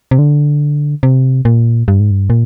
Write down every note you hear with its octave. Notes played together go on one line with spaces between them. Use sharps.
C3
D3
C3
A#2
G2
G#2
G2
A#2